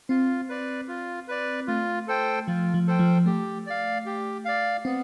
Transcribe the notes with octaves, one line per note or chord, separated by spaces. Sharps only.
C4 F4
B4 D5
F4
B4 D5
A3 F4
A4 C5 G5
F3 F4
F3
A4 C5 G5
F3
A3 G4
D5 F5
G4
D5 F5
B3 C4